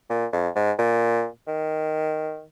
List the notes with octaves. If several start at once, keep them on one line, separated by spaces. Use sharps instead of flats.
A#2
F2
G#2
A#2
D#3